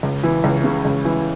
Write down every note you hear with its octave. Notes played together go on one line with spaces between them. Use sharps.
C#2
E3
C#2
C#3
C#2
E3